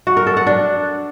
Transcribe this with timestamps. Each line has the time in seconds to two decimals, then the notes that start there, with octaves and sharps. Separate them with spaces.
0.07 F#4
0.17 A#4
0.27 A4
0.37 F#5
0.47 D4